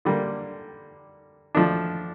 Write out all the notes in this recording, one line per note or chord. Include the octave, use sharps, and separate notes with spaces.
D3 G3 A#3
F3 A3 D4